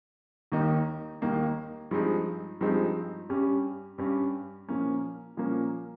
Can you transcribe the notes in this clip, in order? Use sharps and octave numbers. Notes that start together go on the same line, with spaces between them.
D#2 D#3 A#3 D#4
D#2 D#3 A#3 D#4
G2 F3 G#3 C4 D#4
G2 F3 G#3 C4 D#4
G2 G3 C#4
G2 G3 C#4
A#2 F3 A#3 C#4
A#2 F3 A#3 C#4